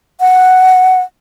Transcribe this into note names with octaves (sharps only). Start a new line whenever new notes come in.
F#5